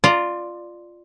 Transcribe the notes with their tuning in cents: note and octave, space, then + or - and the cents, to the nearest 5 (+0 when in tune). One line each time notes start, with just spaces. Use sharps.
F4 +0 D5 +15 A#5 -15